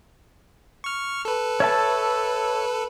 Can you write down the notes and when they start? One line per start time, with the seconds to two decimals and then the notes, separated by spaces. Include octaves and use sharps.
0.84 C#6 F6
1.25 A4 B4
1.60 C#5 E5 A5